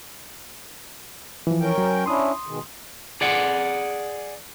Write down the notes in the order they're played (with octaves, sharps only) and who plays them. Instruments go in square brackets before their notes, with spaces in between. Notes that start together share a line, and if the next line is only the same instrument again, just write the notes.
[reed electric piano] E3 F3
[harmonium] C#4 A#4 G5
[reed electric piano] F#3
[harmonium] C#4 D4 E4 [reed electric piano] C6 D#6
[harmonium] B2 D#3 G#3
[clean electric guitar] G#4 D5 F#5